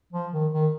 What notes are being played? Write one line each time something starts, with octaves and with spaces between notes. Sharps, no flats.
F3
D#3
D#3